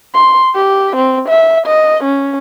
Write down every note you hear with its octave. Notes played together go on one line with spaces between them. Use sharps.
C6
G4
C4
E5
D#5
C#4